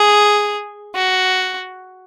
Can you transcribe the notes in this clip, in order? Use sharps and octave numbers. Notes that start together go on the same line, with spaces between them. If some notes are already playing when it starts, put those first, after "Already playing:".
Already playing: G#4
F#4